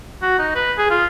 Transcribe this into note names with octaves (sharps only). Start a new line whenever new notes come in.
F#4
D#4
B4
G#4
F4